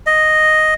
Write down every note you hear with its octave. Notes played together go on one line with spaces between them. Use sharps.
D#5